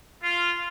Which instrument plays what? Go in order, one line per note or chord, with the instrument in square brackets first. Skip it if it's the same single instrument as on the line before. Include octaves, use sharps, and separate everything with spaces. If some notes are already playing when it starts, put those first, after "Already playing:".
[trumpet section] F4